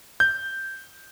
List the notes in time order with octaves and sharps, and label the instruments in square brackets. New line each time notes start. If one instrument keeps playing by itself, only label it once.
[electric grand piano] G6